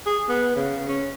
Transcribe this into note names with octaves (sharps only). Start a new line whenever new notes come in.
G#4
B3
C#3
C#4